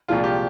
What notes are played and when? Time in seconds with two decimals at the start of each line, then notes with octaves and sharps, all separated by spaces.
0.08 C2 A#2 F3 G#3 F4
0.24 G4